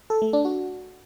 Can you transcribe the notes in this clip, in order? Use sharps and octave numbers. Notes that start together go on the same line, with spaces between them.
A4
A3
D4
F#4